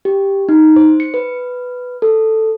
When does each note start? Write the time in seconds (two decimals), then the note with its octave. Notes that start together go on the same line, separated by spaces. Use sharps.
0.05 G4
0.49 D#4
0.76 C5
1.00 C#7
1.14 B4
2.02 A4